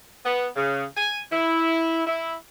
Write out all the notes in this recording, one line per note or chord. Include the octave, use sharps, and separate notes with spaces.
B3
C#3
G#5
E4
E4